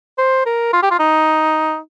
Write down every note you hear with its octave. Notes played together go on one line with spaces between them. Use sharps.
C5
A#4
F4
G4
F4
D#4